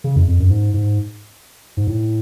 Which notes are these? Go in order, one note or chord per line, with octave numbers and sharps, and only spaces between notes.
C#3
F2
F2
F#2
G#2
G#2
G#2
A2